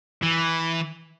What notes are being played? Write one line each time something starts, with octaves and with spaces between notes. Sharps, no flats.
E3